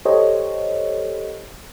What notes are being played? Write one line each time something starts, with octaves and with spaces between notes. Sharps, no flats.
G4 A4 C5 C#5 D#5